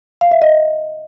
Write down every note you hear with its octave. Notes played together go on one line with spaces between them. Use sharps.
F5
E5
D#5